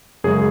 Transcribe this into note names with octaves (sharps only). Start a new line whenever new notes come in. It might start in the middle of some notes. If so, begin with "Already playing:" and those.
F#2 C#3 G#3 G#4